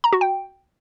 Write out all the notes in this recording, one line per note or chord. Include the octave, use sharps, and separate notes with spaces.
A#5
F#4
G5